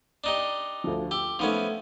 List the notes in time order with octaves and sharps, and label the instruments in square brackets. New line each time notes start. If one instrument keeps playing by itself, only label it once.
[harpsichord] D4 D#4 G4
[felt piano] D2 F3
[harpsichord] G4 [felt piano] E6
[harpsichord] F3 B3 C#4 [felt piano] A3 D#4